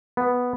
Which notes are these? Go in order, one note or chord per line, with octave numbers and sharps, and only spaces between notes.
B3